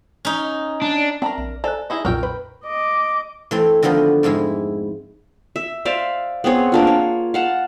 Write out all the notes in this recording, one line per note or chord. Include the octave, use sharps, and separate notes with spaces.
C#4 D#4
D4
C4 D4 A#4 E5 A5 A#5
A#1
A4 C5 D5 G#5 A#5 F#6
D#4 E4 G#4
B1 F2 A#2 A#4 G5 C#6 E6 F6
B4 B5
D#5 D6
E3 A3 C4
D3 D#3 F3 B3 F#4
F2 G#2 G#3 E4
E5
C5 D5 E5 F5
B3 C4 G#4 C#5
A#3 D4 F4
C#5
F5 F#5 A5